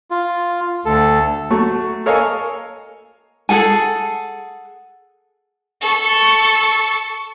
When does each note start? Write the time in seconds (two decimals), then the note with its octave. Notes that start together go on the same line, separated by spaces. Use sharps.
0.11 F4
0.85 D2 A4
1.50 F#3 A3 C#6
2.06 A4 A#4 C#5 D#5 F5 G#5
3.49 G#4 A4 F#5 G#5
5.81 A4 C#6